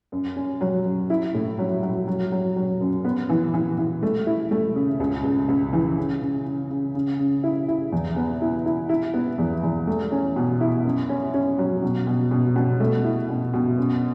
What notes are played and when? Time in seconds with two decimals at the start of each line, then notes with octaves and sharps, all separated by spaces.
0.12 F#2
0.36 C#4
0.61 F#3
0.85 F#2
1.10 E4
1.34 A2
1.58 F#3
1.83 F#3
2.07 F#3
2.32 F#3
2.56 F#3
2.81 F#2
3.05 B3
3.29 E3
3.54 E3
3.78 E3
4.03 A3
4.27 E4
4.51 A3
4.75 C#3
5.00 C#2
5.24 C#2
5.48 C#2
5.73 E3
5.98 C#3
6.22 C#3
6.46 C#3
6.70 C#3
6.95 C#3
7.19 C#3
7.43 E4
7.68 E4
7.92 E2
8.16 B3
8.42 E4
8.66 E4
8.89 E4
9.14 B3
9.38 E2
9.63 E2
9.87 A3
10.12 C#4
10.36 B2
10.61 E4
10.85 F#2
11.09 C#4
11.34 C#4
11.58 F#3
11.83 B2
12.07 B2
12.31 B2
12.56 B2
12.80 A3
13.05 E4
13.29 B2
13.54 B2
13.77 F#2